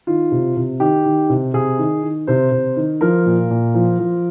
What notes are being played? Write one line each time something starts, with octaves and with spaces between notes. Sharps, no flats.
D#3 F4
C3
C3
D#3 G4
D#3
C3
C3 G#4
D#3
D#3
C3 C5
C3
D#3
F3 A#4
A#2
A#2
F3
F3